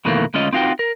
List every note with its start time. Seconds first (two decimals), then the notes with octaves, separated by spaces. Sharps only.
0.05 F2 B2 D#3 E3 A3 A#3
0.34 D2 G#3 C#4 F4 D#5
0.53 C4 D#4 F4 F#4 G5
0.79 A#4